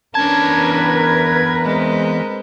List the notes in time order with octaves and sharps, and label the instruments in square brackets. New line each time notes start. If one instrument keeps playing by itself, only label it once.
[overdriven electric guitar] E2 A5 [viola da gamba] C#4 D4 [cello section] A#4 B4 [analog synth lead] G#6
[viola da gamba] G#3 C4